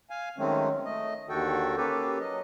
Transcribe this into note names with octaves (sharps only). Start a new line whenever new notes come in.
F5 G#5
D#3 F#3 G#3 A3 C4 C#4
A3 D#5
D#2 D3 D#3 F#4 A4 G5
A#3 C#4 G4 A4 B4
F#3 D#5